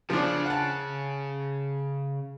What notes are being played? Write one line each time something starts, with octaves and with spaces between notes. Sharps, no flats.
C#3 F3 D4
F#5 A5